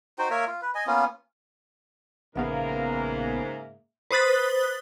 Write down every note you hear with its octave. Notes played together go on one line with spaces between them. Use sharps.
D#4 F#4 C5 G5
A#3 A#4 C#5 E5
F4
B4
D#5 G#5
A#3 B3 C#4 F4
A#1 G#2 C#3 A#3 B3 A#4 E5 F5
B4 C5 D#6 F#6 A6 B6